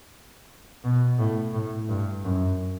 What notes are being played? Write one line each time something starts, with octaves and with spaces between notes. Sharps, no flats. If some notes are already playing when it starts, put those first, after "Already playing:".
B2
A2
A2
G2
F#2